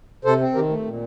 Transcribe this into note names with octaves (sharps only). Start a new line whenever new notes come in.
C3 A4 C5
C4
D#3 G4 A#4
A3
A#2